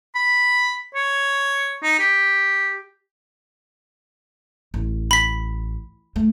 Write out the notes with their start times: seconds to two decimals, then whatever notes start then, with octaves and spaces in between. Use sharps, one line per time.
0.15 B5
0.95 C#5
1.83 D#4
1.99 G4
4.74 A1
5.11 B5 B6
6.16 A3